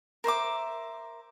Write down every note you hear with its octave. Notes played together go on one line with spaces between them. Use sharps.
A#4 C5 E5 D6